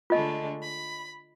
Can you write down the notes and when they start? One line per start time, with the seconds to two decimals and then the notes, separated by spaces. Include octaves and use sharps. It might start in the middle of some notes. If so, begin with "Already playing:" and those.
0.10 D3 G#3 A3 F4 D#5
0.61 B5